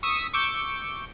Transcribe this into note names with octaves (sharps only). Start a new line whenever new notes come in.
C#6 D#6 E6 B6 D#7
C#6 D6 E6 G6 C#7 D7